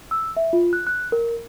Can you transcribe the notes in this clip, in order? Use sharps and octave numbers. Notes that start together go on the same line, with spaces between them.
E6
E5
F4
F#6
F#6
A#4